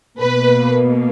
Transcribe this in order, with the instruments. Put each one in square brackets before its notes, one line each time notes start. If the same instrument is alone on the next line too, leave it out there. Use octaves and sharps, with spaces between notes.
[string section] B2 A#3 B4